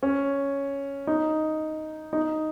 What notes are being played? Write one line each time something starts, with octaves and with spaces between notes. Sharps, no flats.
C#4
D#4
D#4